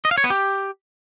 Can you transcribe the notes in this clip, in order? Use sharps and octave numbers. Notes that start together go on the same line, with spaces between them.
D#5
F5
C#5
B3
G4